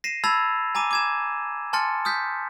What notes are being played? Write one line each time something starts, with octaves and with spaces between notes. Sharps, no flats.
A#6 C7 D#7 E7
A5 B5 E6 G#6 A6 F7
G#5 A#5 D6 D#7
D6 G#6 E7
G#5 A5 C6 F6 A6 C#7
D#6 F6 G6 B6